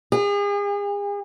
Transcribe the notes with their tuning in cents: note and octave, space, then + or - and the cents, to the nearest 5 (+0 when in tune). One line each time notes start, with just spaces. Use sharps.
G#4 -40